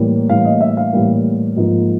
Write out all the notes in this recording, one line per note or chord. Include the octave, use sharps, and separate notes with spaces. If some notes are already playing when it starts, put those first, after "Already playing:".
Already playing: A2 E3 G3 A#3
A2 E3 G3 A#3 F5
D#5
E5
F5
A2 E3 G3 A#3
G#2 F3 A#3